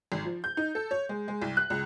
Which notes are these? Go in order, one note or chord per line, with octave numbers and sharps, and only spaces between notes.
G#1
F3
G6
D#4
A4
C#5
G#3
G#3
C2
F#6
C#2